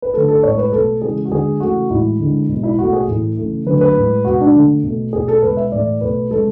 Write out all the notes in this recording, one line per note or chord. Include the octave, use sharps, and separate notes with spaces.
B4
D3 A3 A4
A4
A2 G#3 C#5
B4
B2 A3 A4
C#3 E3 G#3 G#4
F#4
D3 G#3 G#4
C#3 E3 A3 F#4
A2 E3 G#3 E4
D3 G#3
B2 G#3
E4
B2 A3 F#4
G#4
A2 E3 A3
C#3 E3 A3
D3 F#3 A3 B4
B4
A2 G#3
B2 G#3 F#4
D4
D3 A3
B2 A3
B2 A3 G#4
A4
B2 G#3 B4
E5
A2 E3 A3 D5
B2 A3 B4
C#3 G#3 A4